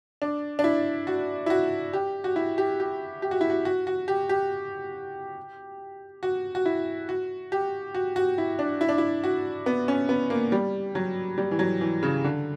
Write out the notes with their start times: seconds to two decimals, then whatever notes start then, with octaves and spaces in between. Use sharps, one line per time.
0.22 D4
0.59 D4
0.64 E4
1.07 F#4
1.46 E4
1.50 F#4
1.93 G4
2.24 F#4
2.36 E4
2.58 G4
2.80 G4
3.22 G4
3.31 F#4
3.41 E4
3.50 F#4
3.65 F#4
3.87 F#4
4.08 G4
4.29 G4
6.23 F#4
6.55 F#4
6.66 E4
7.09 F#4
7.52 G4
7.95 F#4
8.16 F#4
8.38 E4
8.59 D4
8.81 E4
8.89 D4
8.98 E4
9.24 F#4
9.66 B3
9.88 C#4
10.09 B3
10.30 A#3
10.52 G3
10.95 F#3
11.38 G3
11.51 E3
11.59 F#3
11.81 E3
12.03 C#3
12.24 D3